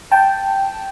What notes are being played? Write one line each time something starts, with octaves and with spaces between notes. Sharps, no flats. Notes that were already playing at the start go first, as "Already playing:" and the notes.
G5 A5